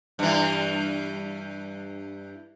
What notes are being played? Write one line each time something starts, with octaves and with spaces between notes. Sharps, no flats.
G2 E3